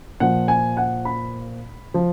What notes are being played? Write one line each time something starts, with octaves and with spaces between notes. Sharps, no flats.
A#2 F3 F#5
G#5
F#5
B5
F3